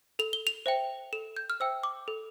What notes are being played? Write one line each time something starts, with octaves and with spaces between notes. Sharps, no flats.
A4 F7
G7
F7
C5 E5 G5
A4 E7
G6
F6
C5 E5 G5 E6
D6
A4